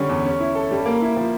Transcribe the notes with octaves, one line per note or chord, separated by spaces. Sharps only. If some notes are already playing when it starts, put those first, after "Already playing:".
Already playing: D3 G3 C#4
E2
C#4
E4
A4
G3
A#3
E4
F3